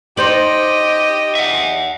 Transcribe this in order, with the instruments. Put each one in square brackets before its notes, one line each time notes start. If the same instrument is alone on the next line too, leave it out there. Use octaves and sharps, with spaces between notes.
[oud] D#4 C5 D5 [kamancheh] G4 D#5 [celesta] C6 G6 F#7
[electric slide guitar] E5 F#5